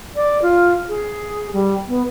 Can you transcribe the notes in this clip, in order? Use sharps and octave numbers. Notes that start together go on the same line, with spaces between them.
D5
F4
G#4
G3
B3